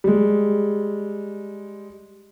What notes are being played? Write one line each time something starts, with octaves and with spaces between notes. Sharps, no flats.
G3 G#3